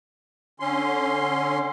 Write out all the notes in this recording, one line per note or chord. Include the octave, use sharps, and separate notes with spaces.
D3 C#4 C6